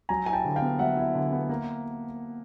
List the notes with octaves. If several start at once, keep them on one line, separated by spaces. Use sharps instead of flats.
F#3 G#5 A#5
E4 G#5
G5 A5
D3
F5 G5
B3
F#3 E5 F#5
E4
D3
B3
A#3